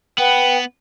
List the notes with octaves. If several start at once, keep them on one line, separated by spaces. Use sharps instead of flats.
B3 B4 F#5 G5